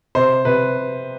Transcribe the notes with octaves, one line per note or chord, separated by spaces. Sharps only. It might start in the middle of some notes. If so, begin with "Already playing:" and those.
C3 C5
C3 B4